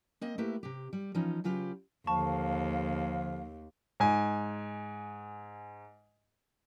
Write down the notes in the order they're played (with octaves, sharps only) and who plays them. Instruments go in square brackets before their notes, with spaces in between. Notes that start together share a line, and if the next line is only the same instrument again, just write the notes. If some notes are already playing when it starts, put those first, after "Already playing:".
[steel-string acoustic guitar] A#3 C4 D#5
A3 A#3 E4 G4 B4 E5
C3 G4
G3
E3 F3 C#4 D#4 F4
C#3 F#3 F4 G4 B4
[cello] D#2 [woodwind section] D3 F3 F5 [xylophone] A5 C#6
[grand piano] G#2 G#5